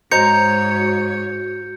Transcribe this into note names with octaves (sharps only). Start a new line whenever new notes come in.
G#2 F#4 C5 C#5 D#5 A#5 G6 C#7